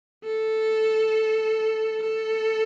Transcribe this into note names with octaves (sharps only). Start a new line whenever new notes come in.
A4
A4